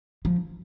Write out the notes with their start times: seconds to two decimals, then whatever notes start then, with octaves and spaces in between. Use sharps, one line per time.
0.25 F3